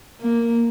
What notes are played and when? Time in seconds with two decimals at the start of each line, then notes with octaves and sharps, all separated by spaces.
0.21 A#3